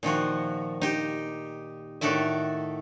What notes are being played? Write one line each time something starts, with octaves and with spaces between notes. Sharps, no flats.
A#2 D#3 F3 F#4
D#4 G4
A2 D#3 F#4 A4 D5 E5